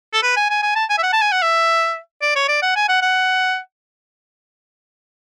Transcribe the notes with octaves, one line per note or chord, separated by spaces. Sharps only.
A4
B4
G#5
G#5
G#5
A5
G#5
E5
F#5
A5
G#5
F#5
E5
D5
C#5
D5
F#5
G#5
F#5
F#5